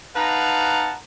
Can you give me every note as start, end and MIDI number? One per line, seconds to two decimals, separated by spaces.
0.15 0.93 63
0.15 0.93 71
0.15 0.93 77
0.15 0.93 78
0.15 0.93 81
0.15 0.93 82